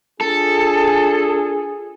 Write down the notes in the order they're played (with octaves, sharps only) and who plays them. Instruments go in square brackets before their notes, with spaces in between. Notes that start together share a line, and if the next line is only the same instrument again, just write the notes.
[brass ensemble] D4 F4 G#4 [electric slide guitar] A4